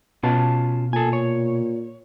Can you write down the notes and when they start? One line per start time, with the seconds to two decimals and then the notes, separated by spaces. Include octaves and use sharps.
0.23 B2 C#4 F4 A5
0.93 A#2 A4 G#5
1.13 C#5